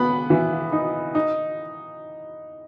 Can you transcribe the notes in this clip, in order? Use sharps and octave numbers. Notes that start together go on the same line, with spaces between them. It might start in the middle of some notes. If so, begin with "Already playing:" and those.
Already playing: B3 B5
E3
D#4
D#4